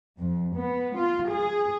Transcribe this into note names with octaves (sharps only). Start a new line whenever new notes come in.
F2
B3
F4
G#4